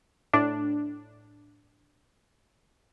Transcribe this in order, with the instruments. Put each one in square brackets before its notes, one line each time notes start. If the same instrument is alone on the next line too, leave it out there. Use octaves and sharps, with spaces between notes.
[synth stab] A2 D4